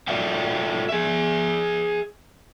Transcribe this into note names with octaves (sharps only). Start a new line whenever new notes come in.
F4 A4 D5 E5 F5 G5
G#4 E5